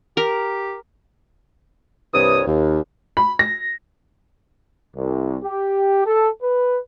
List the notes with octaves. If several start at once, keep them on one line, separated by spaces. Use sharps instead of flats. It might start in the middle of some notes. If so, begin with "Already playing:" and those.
G4 A#4
C2 G2 C3 E3 C#5 D#6
D#2
B5
A#6
C2
G4
A4
B4